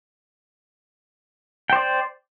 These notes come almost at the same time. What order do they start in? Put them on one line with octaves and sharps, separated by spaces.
G5 C5 D5